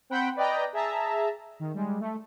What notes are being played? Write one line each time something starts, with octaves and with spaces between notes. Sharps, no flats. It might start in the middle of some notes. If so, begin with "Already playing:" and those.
C4 C5 F#5 G5 B5
B4 D5 D#5 G5 A#5
G#4 E5 A5 A#5
D#3
G3 G#3
A3